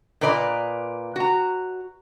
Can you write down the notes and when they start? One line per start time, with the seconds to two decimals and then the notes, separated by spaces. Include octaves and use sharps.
0.21 A#2 A#3 B4 D5 D#5 A#5
1.16 F#4 A#5